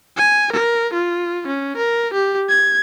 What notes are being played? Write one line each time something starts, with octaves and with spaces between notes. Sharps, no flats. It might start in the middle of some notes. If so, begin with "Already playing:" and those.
G#5
A#4
F4
C#4
A#4
G4
G#6